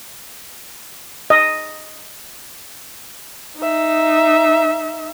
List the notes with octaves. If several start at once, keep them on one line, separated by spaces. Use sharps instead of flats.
D#5
D#4 E5